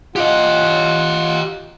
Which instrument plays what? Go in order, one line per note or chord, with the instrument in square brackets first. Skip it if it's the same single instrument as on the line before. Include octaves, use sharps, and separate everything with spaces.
[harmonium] F4 F#5 [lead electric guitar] G4 D#5